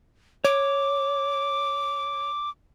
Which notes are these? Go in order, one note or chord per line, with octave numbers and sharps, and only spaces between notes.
C#5 D6